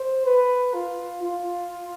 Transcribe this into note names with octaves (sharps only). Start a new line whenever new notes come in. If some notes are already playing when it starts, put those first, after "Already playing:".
Already playing: C5
B4
F4
F4